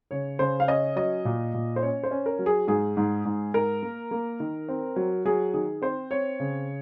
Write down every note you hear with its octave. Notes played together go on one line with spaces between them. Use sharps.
C#3 C#5
C#3 C5
F5
C#4 D#5
F#3 D#5
A#2
A#2
C5
C#4 C#5
C5
C#4
A#4
F#3
G#4
G#2 G#4
G#2
G#2
G#2 A#4
A#3
A#3
D#3
C4
F#3
F#3 G#4
D#3 G#4
C4 C5
C4 C#5
C#3